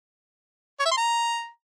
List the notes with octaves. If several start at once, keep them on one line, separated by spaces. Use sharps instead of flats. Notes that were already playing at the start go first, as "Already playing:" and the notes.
C#5
E5
C6
A#5